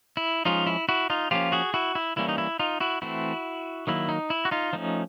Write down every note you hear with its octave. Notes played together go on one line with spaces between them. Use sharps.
E4
F3 G#3 C#4 D#4 F4
E4
E4 F#4
D#4 F4
F3 A#3 C#4 F4 G4
F#4 G#4
E4 F#4
E4
E3 G3 A#3 C#4 E4
D#4
E4
D#4 F4
E4 F#4
E3 A3 C4 E4 F#4
D#3 F#3 A#3 E4
D#4
E4
F#4
D#4 F4
F3 A3 C#4 D#4